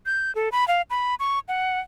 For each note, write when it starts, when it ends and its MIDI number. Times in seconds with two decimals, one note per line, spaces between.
0.06 0.34 91
0.35 0.49 69
0.52 0.67 83
0.68 0.82 77
0.90 1.15 83
1.20 1.39 85
1.48 1.80 78